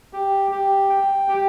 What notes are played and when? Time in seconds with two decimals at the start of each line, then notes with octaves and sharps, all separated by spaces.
0.13 G4
0.51 G4
0.90 G5
1.28 G4